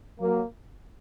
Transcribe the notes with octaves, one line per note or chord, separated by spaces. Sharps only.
F#3 A#3